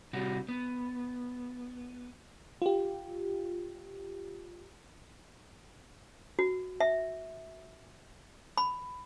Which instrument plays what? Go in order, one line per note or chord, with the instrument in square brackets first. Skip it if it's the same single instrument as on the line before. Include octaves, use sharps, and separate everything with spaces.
[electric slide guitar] C3 G3 F#4
B3
[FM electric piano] F4 G4
[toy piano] F#4
E5
B5